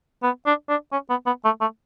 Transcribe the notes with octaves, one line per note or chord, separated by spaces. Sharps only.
B3
D4
D4
C#4
B3
B3
A3
A3